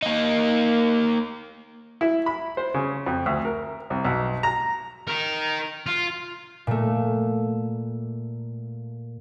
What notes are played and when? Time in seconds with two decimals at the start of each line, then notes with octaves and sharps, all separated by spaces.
0.03 A#3 D#4
2.01 E4
2.26 B5
2.57 C5
2.74 C#3
3.06 F2
3.26 D2
3.45 A#4
3.90 C2
4.05 B1
4.43 A#5
5.07 D#4 A#4
5.86 F4
6.67 A#2 A3